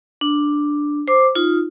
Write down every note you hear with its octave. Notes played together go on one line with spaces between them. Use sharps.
D4
C5 D6
D#4 F4